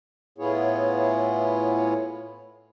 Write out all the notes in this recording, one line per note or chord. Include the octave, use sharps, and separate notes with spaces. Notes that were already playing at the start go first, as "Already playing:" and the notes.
A2 B3 E4 F4 G#4 C#5